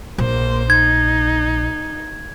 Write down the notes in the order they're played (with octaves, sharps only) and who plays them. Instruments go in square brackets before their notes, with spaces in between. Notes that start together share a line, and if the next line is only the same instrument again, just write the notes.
[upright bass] A#1 [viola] A#3 C5
[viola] D#4 [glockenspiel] G#6